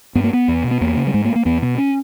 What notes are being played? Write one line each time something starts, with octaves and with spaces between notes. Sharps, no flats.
G2 B3
A#3
B3
E2
B2
B3
E2 A#3
C#3
G3
G#2 G#3
A#3
A#3
E2 B3
B2 B3
C#4